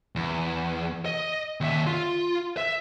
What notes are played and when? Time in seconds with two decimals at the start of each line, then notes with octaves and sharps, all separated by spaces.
0.16 E2
1.06 D#5
1.61 D#2 E5
1.87 F4
2.57 E5